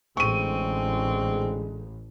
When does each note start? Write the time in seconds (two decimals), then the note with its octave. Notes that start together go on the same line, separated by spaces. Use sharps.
0.17 A1 D3 G#3 C4 G#4 C#6 D#7